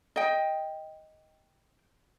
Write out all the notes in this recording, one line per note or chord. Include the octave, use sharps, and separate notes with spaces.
D#5 G5